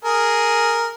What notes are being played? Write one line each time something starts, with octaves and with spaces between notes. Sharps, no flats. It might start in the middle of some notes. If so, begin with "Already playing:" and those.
G#4 A#4